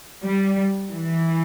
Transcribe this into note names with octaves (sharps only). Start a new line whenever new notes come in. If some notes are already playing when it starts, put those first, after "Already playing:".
G3
E3